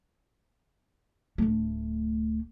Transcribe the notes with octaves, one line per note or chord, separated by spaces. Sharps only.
D1 A3